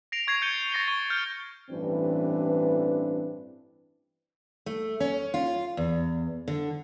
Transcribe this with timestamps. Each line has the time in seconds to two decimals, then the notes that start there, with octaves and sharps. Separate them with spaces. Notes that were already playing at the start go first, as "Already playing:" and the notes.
0.12 A#6 C7 D7 F7
0.27 C#6 G#6 A#6 C7 F7
0.42 G6 A6 C#7 D#7 G7
0.72 C#6 A6 A#6 C7 F7 G7
0.88 C#6 D#7 G7
1.10 F6 G6 G#6 C#7
1.71 A1 G2 E3 C4 D4 B4
4.66 A3
5.00 C#4
5.34 F4
5.77 E2
6.48 D3